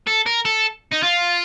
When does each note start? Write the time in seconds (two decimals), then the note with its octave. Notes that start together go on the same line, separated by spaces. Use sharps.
0.07 A4
0.26 A#4
0.45 A4
0.92 D#4
1.03 F4